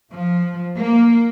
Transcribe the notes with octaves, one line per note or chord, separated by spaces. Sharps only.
F3
A#3